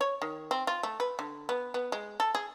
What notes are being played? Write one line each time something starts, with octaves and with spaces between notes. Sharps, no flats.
C#5
D#3
C4
F4
A3
B4
D3
B3
B3
G#3
A4
G#4